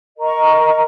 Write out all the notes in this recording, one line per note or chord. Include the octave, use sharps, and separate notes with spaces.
A#4 D#5 A#5 C#6